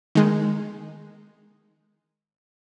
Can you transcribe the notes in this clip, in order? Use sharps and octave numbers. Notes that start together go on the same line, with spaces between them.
D#3 G#3